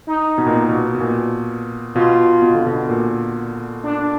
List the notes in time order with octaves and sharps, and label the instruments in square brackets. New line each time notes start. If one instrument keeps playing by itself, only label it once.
[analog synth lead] D#4
[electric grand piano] B2
A#2
B2
B2
B2
A#2
[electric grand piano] B2 [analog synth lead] F4
[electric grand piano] B2
D3
B2
A#2
[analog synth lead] D4